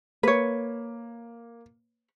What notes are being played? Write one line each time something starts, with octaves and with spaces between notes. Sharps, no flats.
A#3 B4 C#5